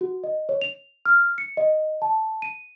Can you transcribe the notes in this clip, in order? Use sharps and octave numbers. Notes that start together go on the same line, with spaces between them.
F#4
D#5
C#5
F7
F6
C#7
D#5
A5
D#7